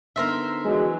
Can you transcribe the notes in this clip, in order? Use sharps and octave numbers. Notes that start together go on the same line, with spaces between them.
D3 B3 D#4 A#4 C5 E5
E3 F#3 G#3